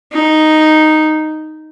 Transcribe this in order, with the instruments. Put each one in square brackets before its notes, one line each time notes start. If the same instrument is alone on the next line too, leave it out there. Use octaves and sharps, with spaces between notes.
[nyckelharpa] D#4